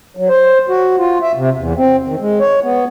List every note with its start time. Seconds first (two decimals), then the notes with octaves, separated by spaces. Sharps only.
0.17 F#3
0.29 C5
0.69 F#4
0.98 F4
1.22 E5
1.35 C3
1.57 E2
1.76 C4
2.06 D#3
2.20 G#3
2.40 C#5
2.63 B3